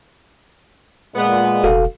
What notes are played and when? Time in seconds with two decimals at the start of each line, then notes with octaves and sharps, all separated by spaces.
1.16 A#2 G#3 B3
1.64 E1 F#4 A4 F5